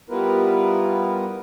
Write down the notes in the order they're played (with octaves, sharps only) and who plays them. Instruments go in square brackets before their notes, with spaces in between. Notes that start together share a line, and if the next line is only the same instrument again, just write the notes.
[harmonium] G3 B3 E4 F4 A#4 B4